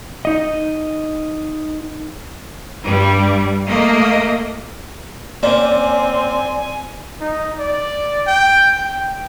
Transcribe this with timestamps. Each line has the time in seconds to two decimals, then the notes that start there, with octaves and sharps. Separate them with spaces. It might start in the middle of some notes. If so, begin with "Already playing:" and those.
0.25 D#4 D#5
2.83 G2 G3
3.67 A3 A#3 D#5
5.43 A#3 C4 C#4 C5 D5 G#5
7.21 D#4
7.58 D5
8.27 G5
8.78 G5